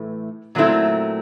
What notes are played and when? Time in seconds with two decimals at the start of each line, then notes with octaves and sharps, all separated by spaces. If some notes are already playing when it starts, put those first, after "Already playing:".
Already playing: A2 E3 A3
0.55 A#2 F#3 A3 C4 E4